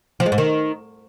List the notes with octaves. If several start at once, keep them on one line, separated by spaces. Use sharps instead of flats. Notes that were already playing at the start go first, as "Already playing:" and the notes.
F3
G#3
G#2
D#3